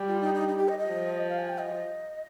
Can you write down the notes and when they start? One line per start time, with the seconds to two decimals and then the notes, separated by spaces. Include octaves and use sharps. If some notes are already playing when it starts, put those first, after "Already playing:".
Already playing: G3
0.08 F4
0.21 D#4
0.34 D#4
0.48 D#4
0.58 G4
0.68 D#5
0.79 D#5
0.89 F3
1.29 F5
1.38 G#5
1.49 G5
1.59 D#5